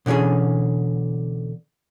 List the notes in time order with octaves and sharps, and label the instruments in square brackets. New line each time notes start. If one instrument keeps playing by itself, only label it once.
[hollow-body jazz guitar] B2 D3 E3 C#4 G#4